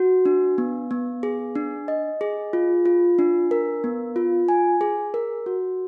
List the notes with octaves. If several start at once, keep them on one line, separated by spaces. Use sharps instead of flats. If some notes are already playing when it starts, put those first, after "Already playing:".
Already playing: F#4
D4
B3
B3
G#4
D4
D#5
G#4
F4
F4
D4
A#4
B3
F4
G#5
G#4
A#4
F#4